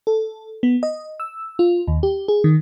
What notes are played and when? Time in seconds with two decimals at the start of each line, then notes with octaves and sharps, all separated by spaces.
0.07 A4
0.63 B3
0.83 D#5
1.20 E6
1.59 F4
1.88 D#2
2.03 G4
2.28 G#4
2.44 D#3